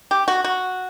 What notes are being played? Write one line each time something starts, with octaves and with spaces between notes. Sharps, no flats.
G4
F#4
F#4